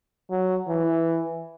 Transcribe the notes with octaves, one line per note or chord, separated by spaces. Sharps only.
F#3
E3